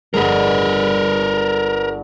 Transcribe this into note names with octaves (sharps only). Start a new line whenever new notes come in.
G1 G#3 A#4 B4